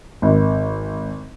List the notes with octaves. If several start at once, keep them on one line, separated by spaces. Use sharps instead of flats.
G#1